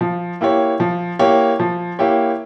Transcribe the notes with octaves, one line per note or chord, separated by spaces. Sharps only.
F3
A#3 E4 G4 C#5
F3
A#3 E4 G4 C#5
F3
A#3 E4 G4 C#5